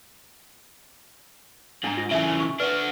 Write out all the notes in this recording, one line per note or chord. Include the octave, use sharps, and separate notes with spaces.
G#2 D4 A#5
F4
C#3 E3 E5 G#5
C#6
D4 F#4 B4